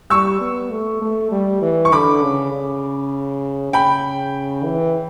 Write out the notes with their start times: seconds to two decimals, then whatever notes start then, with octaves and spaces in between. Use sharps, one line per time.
0.10 G3 C#6 E6
0.41 B3
0.71 A3
1.02 A3
1.32 G3
1.62 E3
1.85 C#6
1.92 D3 B5 D6
2.23 C#3
2.53 C#3
3.73 C#3 G5 B5
4.65 E3